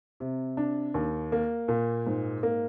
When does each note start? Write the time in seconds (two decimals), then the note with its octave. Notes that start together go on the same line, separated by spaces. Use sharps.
0.20 C3
0.57 D4
0.94 D#2
1.32 A#3
1.68 A#2
2.07 G#2
2.43 A#3